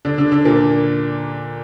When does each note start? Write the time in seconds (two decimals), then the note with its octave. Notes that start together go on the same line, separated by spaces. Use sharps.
0.05 D3 D4
0.18 D3 D4
0.32 D3 D4
0.45 A#2 A#3